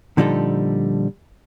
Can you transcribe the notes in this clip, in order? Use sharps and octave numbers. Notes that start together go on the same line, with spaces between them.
A#2 D3 F3 G3 D#4 A4